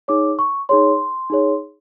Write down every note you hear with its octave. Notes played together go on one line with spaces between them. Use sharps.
D#4 G#4 C#5 D6
C#6
D#4 G#4 C#5 C6
D#4 G#4 C#5